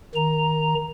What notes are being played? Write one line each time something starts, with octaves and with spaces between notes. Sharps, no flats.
D#3 A#5